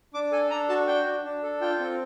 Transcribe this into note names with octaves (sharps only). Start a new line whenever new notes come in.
D4 D6
A4 G#5
D4 A#5
F#4 A5
D4 G5
D4
D4
A4
F4 G5
C4